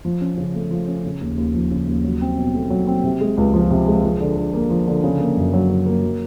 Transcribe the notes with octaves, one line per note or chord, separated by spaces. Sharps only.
F3
C#4
C#3
A3
F3
C#4
C#3
D#2
D#2
F3
C#3
D#2
F#3
C4
B2
A3
F#3
C4
C3
G#3
C#2
F3
C3
G#3
F3
D3
D3
A#3
F3
D3
C#3
A#3
F#2
F#3
C#3
A#3
F#3